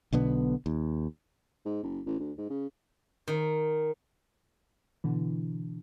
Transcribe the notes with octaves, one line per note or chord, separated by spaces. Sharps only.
B1 B2 D3 B3
D#2
G#2
F#1
A1
D2
G#2
C#3
D#3
B2 D3 E3